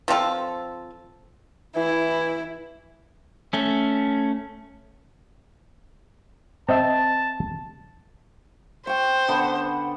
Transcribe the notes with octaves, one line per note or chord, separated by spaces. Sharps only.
F3 C4 F4 A4
E3 E4
A3 C#4
C4 D#5 E5 A5
C5 G5 C#6
D3 B3 F#5